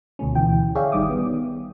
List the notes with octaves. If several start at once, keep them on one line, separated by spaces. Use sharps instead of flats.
D2 B2 A3 C#4
D2 B2 E3 G5
G#4 C#5 D5 E5 F5 G5
G1 D#3 G3 D6 D#6
B3